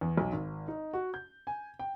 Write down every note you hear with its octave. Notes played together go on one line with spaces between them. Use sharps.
E2
B1
G#1
D#4
F#4
G6
G#5
G5